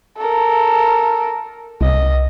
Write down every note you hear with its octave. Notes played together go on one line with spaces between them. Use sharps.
A4 A#4
C2 D#5